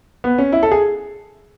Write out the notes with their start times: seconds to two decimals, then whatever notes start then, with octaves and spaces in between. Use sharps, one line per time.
0.24 B3
0.38 C#4
0.52 E4
0.63 A4
0.72 G#4